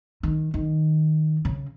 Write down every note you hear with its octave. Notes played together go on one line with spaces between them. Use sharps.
D#3
D#3
C#3